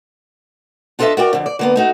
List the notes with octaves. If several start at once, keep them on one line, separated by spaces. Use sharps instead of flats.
D4 F4 A4 B4 D#5 E5
F#4 A#4 D5 G5
F2 D3
D5
D3 A#3 B3
A3 D#4 F#4